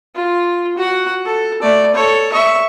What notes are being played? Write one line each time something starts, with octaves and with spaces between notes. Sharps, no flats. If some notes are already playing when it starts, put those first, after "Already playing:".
F4
F#4 F#5
A4
A3 D5
A4 C#5
E5 C#6